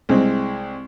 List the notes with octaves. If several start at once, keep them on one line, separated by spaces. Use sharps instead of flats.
C2 G#3 C4